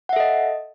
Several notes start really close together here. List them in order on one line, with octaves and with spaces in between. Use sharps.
F#5 E5 A4 D#5